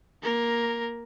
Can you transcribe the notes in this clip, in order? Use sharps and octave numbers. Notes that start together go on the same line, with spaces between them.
A#3 A#4